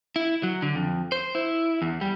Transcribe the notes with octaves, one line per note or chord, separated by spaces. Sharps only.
E4
F#3
D3
F2
C5
E4
E2
G3